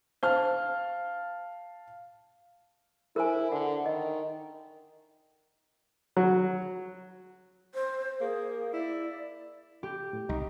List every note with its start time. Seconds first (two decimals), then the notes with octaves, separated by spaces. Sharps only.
0.23 C5 F5 A5 F6
3.16 E4 A#4 C5 G#5
3.52 D3 F#5
3.86 D#3 D#5
6.17 F#3
7.75 C5
8.20 A#3 G#4
8.73 E4 D5
9.83 G4
10.13 A2
10.29 C2 D#4